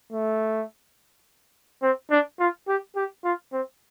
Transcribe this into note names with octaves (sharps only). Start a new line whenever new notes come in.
A3
C4
D4
F4
G4
G4
F4
C4